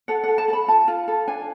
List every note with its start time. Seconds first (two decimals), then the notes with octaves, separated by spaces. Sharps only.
0.08 A4 F#5
0.23 F#5
0.28 A4
0.38 A5
0.48 A4
0.53 B5
0.68 F4 A5
0.88 F4
1.08 A4
1.28 D4 G#5